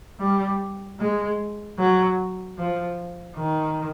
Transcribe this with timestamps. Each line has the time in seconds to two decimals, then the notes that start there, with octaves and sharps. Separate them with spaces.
0.20 G3
1.00 G#3
1.79 F#3
2.58 F3
3.36 D#3